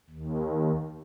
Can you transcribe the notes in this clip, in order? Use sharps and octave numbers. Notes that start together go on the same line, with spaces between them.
D#2